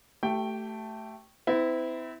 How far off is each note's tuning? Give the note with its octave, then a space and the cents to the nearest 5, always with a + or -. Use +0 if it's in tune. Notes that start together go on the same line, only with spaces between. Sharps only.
A3 +0 G4 -30 G5 +0
C4 -40 E4 -15